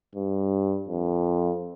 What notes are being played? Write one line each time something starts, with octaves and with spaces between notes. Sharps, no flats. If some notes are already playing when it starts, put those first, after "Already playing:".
G2
F2